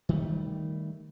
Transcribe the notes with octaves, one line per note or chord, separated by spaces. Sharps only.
D#3 G3 A3